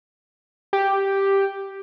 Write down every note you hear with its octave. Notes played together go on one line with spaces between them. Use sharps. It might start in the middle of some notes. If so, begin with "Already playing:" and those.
G4